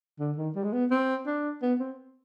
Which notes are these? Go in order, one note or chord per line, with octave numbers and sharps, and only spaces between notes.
D3
D#3
G3
G#3
B3
C4
D4
B3
C4